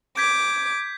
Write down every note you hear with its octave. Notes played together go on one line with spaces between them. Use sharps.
D6 G6 G#6 B6